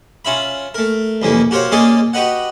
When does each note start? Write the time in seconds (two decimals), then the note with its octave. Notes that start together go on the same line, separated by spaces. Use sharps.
0.25 C#4 F4 E5 B5
0.74 A3 A#4
1.22 C2 F2 C#3 E3 A#3
1.51 F#4 G4 A#4 C5 C#5 F5
1.72 G#3 A#3 C#4 G#4 D5 D#5
2.13 F#4 G4 B4 D#5 F#5